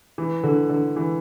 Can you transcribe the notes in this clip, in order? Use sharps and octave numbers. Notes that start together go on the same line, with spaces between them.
E3
D3
D3
E3